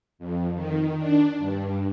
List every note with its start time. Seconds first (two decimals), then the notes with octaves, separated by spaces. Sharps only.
0.19 F2
0.54 D#3
0.98 D4
1.38 G2